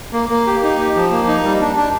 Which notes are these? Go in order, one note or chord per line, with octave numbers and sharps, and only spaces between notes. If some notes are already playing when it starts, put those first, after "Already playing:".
A#3
A#3
G4
D#4
G4
F3
A#3
D#4
G3
D4
D4